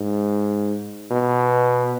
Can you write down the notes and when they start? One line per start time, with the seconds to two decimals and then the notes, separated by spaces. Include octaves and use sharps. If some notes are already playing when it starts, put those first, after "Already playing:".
Already playing: G#2
1.11 B2